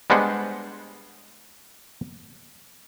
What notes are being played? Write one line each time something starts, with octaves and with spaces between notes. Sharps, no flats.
G3 G#3 B3 D4 C5 F#5